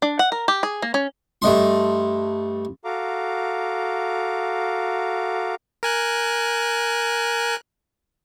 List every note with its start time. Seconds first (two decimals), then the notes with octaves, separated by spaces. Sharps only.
0.02 D4
0.19 F#5
0.32 A#4
0.48 G4
0.63 G#4
0.82 A#3
0.94 C#4
1.42 G2 A3 D#5 C6
2.85 F#4 A4 F5 A#5 D6
5.83 A#4 G#5 F#6